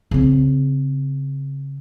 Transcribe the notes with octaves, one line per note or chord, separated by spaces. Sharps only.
C#3 C4